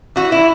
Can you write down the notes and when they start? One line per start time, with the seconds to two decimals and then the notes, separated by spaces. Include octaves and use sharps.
0.16 E3 F#4
0.32 E4